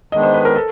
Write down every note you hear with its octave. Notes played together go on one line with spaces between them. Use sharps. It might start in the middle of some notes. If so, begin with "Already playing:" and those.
D#3 G#3 B3 D4 D#5
C5
B4
A#4
A4